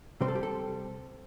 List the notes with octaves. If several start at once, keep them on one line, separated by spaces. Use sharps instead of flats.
C3 G3 C4 C5
A4
G4
A4